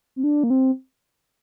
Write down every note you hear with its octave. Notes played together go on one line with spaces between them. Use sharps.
C4
D4
A#3
C4